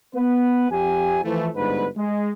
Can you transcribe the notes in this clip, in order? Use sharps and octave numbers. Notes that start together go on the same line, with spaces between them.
B3 B4
F2 G4 G#5
E3 F3 A3
G1 G#2 D4 B4
G#3